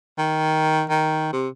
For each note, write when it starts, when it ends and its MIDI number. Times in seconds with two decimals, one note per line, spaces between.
0.18 0.85 51
0.90 1.32 51
1.33 1.48 48